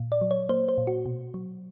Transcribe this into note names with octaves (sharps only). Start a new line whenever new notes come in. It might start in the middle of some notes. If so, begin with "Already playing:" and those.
Already playing: A#2
D5
F#3
C#5
A#3 C5
C5
A#2
F#4
B2
F#3